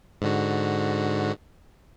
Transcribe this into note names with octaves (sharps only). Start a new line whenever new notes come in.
G#2 D3 F#4